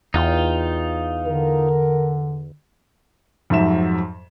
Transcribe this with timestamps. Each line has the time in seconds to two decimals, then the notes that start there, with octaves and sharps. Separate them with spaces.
0.14 E2 D#4 F4 G5
1.26 D3 A#4
3.50 F2 G#2 F#3 E5 E7